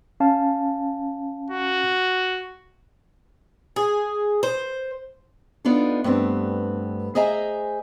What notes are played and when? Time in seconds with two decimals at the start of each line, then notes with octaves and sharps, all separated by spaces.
0.20 C#4 F5 A5
1.50 F#4
3.76 G#4
4.43 C5
5.65 B3 D4 D#4 F4 A4
6.04 G2 A3 B3 C4
7.15 G#4 C5 D#5 E5 G#5 A#5